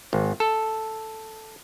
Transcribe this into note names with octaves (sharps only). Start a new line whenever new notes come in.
G#1
A4